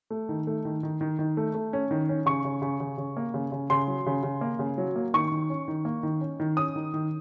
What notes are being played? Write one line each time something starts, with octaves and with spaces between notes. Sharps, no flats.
A3
D#3
A3
D#3
D#3
D#3
D#3
A3
A3
C#4
D#3
C#4
C#3 C#6
C#3
C#3
C#3
C#3
A#3
C#3
C#3
C#3 C6
F#3
C#3
C#3
A#3
C#3
F#3
A#3
D#3 C#6
D#3
C#4
D#3
A#3
D#3
C#4
D#3
C#4 D#6
D#3
D#3